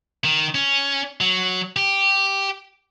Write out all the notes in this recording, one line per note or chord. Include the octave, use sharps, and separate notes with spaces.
D#3
C#4
F#3
G4